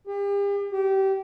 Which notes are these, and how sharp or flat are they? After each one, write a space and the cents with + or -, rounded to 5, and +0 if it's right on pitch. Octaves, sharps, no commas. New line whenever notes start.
G4 +40
G4 -25